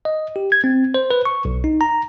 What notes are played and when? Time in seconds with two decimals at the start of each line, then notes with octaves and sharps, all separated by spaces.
0.05 D#5
0.36 G4
0.52 G#6
0.64 C4
0.94 C5
1.11 B4
1.25 C#6
1.45 B1
1.64 D#4
1.81 A#5